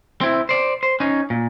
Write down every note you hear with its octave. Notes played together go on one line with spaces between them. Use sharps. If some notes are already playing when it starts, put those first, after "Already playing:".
C4 E4
C5 D5
C5
C#4 D#4
A#2